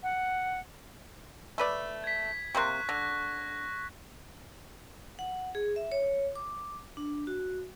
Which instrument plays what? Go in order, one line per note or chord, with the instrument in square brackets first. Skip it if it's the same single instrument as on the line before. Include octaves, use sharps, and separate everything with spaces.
[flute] F#5
[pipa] A3 B4 D5
[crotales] G#6 B6
[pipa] C3 A#3 C6 [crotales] C#6 F#6
[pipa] D3 [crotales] A#6
[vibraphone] F#5
G#4
E5
C#5
D6
D4
F#4